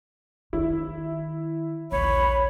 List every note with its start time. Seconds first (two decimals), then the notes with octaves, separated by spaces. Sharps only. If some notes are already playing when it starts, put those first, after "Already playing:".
0.53 D#3 E4
1.92 A#1 D#2 C#5 B5